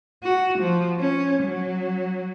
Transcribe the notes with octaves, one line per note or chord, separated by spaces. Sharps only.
F#4
F3
C#4
F#3